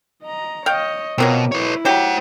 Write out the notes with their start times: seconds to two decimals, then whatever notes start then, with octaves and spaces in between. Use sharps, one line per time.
0.23 D#5 A#5
0.66 C#5 D#5 F5 G5
1.18 B2 F#3 A#3 C4 F4
1.52 E4 B4 C#5
1.85 F#3 G4 C5 F#5